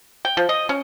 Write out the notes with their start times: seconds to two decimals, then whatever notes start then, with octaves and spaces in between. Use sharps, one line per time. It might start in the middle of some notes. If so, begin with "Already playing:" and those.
0.25 G5
0.37 F3
0.49 D#5
0.69 C#4